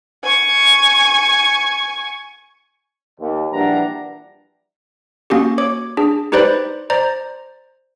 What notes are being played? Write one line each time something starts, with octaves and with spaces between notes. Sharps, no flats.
G#5 C#6
D#2
A#1 E3 G3 D4 F#5 A#5
A#3 C#4 F#4 G4
C#5 D6
D4 G#4
D#4 G4 B4 C5 D5 B5
C5 D5 A#5